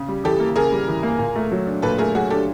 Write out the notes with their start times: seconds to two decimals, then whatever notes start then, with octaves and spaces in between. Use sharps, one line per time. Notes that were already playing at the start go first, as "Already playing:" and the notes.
Already playing: C#3
0.08 G3
0.24 E3 G4 A4
0.40 A#3
0.56 C#3 G#4 A#4
0.72 G3
0.88 E3
1.03 A#3
1.19 A#2
1.35 A3
1.52 F#3
1.67 D4
1.82 A#2 A4 B4
1.98 A3 G#4 A#4
2.15 F#3 F#4 G#4
2.30 D4 G4 A4